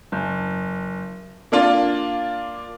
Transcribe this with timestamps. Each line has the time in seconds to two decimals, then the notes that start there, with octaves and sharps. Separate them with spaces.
0.12 F#1
1.52 A#3 D4 F4